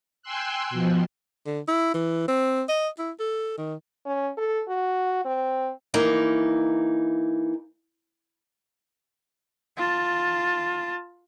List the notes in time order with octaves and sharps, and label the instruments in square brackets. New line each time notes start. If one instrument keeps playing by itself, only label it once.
[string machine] G5 G#5 C6 E6 F#6
B2 F3
[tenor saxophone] D3
E4
E3
C4
D#5
E4
A4
D#3
[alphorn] C#4
A4
F#4
C4
[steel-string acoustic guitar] E3 A#3 D#4
[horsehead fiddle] F4 A5